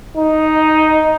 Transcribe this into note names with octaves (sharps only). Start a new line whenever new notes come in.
D#4